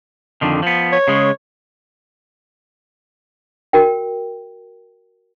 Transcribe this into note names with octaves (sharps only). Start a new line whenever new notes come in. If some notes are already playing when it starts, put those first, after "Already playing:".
F2 D3 D#3
F3 B3
C#5
C#3 G#3
F#4 A#4 G5